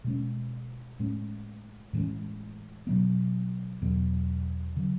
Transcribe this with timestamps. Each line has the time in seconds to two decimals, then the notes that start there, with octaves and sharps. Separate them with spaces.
0.04 B2 G#3 C#4
1.00 A2 G#3 C#4
1.93 A2 E3 G#3 C#4
2.87 B2 F#3 B3
3.81 E2 B2 F#3 B3
4.77 C#3 F#3